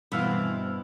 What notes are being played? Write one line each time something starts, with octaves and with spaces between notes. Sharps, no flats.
G2 B2 E3 B3 C4 E4 F5